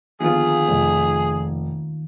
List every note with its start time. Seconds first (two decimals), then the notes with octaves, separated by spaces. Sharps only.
0.20 D#2 D3 F3 B3 F4 G#4
0.68 F1